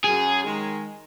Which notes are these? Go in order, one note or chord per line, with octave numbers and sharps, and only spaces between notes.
F#2 G#4
D#3 G#3